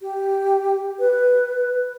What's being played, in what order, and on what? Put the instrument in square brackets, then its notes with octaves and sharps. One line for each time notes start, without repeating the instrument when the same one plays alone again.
[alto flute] G4
B4